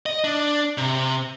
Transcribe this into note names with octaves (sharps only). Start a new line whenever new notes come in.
D#5
D4
C3